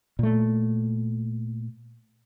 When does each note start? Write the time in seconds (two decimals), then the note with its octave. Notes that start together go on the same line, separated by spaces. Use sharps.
0.19 A#2 A3